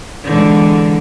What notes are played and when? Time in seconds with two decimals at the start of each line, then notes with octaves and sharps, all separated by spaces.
0.24 D3 E3 G#3